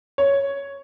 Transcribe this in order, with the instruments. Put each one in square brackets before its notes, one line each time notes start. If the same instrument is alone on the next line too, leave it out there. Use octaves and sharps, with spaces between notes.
[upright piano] C#5